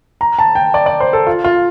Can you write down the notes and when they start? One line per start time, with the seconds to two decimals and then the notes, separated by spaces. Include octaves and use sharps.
0.21 A#5
0.39 A5
0.55 G5
0.74 D5
0.86 D5
1.00 C5
1.13 A4
1.27 F4
1.44 F4